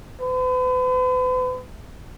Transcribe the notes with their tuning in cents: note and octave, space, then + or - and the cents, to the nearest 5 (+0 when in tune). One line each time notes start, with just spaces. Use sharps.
B4 +40